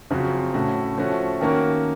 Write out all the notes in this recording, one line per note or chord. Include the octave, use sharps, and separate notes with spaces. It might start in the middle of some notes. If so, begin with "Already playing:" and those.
F#2 C#3 F3 C4 F#4
A2 A3 C#4 F#4
F3 A3 C#4 F#4
D#3 A#3 C#4 F#4 A#4